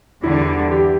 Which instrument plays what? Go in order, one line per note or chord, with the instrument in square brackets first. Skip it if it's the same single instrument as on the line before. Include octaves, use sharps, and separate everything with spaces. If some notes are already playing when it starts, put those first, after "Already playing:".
[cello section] E2 D3 G3 [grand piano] E4
[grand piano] G4